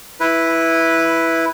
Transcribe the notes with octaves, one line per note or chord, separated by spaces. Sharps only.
E4 B4